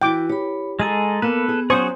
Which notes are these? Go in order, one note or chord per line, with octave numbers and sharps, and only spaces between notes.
E3 E4 F#4 G5 D6
G4 C#5 B5
G#3 G#4 A4 G#5 A#5
A#3 B3 A4 B4
G#4
F#3 C#4 F#4 G#4 C5 C#6 D#6